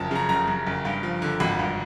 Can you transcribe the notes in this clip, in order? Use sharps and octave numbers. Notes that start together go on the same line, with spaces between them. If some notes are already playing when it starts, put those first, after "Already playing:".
Already playing: F#1 F#2 F3 A5
C#3 A#5
F#1 A#5
F#2
F#1
G2
F3
D3
G#1 B5
G2